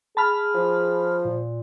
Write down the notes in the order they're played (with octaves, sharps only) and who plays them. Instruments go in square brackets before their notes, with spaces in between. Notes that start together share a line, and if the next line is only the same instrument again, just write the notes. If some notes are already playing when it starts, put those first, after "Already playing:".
[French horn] G#4 [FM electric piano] A5 B5 F6
[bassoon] F3
[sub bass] A#2